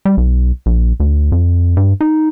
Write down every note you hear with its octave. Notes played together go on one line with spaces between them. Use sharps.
G3
B1
A#1
D2
F2
G2
D#4